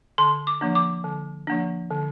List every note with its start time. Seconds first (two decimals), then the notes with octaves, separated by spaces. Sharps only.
0.18 D3 C6
0.47 D6
0.61 F3 A#3 D4
0.75 D6
1.04 D3
1.47 F3 A#3 D4
1.90 D3